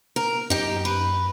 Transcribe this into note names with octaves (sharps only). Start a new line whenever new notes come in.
A#4
F#2 D#4 G4
B4